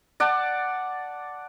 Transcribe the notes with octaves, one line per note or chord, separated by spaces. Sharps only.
D5 F#5 A5